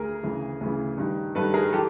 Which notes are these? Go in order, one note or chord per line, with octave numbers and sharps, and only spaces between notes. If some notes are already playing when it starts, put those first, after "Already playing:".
Already playing: D2 D3 G#4 A#4
D2 C#3 E3
D2 C#3 E3
G2 D#3
G2 D#3 A4 B4
G#4 A#4
E3 G4 A4